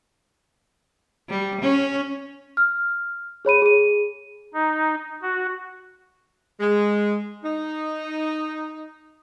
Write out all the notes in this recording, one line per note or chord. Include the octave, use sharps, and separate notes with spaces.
G3
C#4
F6
G#4 C#5 B5 D#7
G#4 D#7
D#4
F#4
G#3
D#4